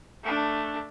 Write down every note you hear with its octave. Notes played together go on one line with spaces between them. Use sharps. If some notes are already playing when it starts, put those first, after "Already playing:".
A3 D4